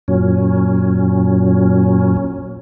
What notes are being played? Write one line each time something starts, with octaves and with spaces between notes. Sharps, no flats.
F#2 A#2 F#3 C#4